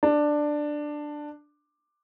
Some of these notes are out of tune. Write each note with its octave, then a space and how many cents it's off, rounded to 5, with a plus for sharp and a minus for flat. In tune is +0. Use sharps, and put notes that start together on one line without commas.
D4 +10